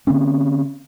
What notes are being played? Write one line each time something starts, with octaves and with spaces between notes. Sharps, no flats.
D3 A#3 C4 C#4